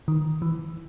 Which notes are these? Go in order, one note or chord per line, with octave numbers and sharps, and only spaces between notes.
D#3
E3